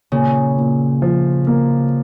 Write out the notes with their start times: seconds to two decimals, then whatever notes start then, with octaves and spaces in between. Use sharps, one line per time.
0.12 A#2 C#3
0.57 A#2
1.02 F3
1.47 A#3